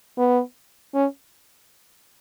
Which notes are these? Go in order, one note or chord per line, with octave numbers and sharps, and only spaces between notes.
B3
C#4